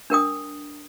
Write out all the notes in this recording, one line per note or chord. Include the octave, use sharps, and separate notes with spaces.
D4 A#4 G5 D#6